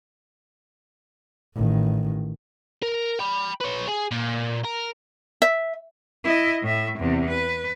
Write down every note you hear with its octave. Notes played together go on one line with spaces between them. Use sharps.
A1 D#3
A#4
G5 B5
B4 C#5
G#4
A#2
A#4
E5
E4 D#5
A2 E5
E2 C3
B4